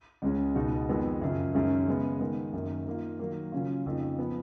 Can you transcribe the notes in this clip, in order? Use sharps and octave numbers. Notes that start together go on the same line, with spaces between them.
C#2 C#3 G#3 C#4
C#2 B2 G#3 D#4 F#4
F2 D#3 G#3 B3
F#2 C#3 F3
F#2 D#3 G#3 C#4
C#3 G#3 B3
D#3 G#3 B3
F#2 D#3 A#3
D#3 A#3 F4
D#3 F#3 A#3
C#3 F#3 C#4 F4
F2 C#3 F3 A#3 D#4
F3 B3